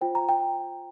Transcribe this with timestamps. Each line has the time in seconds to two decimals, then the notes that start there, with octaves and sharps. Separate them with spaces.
0.01 F4 C5 G5
0.15 A#5
0.29 G5